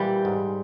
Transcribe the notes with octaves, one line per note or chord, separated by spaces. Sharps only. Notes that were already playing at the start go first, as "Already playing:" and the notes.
Already playing: A#2 E3 G3
G#2